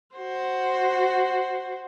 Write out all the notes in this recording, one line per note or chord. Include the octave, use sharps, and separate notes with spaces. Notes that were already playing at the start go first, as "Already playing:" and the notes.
F#4 C5